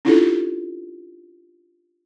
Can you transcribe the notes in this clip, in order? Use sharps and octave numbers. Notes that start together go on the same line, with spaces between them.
C#4 D4 E4 F4 G4 A4